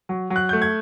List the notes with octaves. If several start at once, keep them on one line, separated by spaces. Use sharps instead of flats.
F#3
F#3
F#6
A3 G6
G#6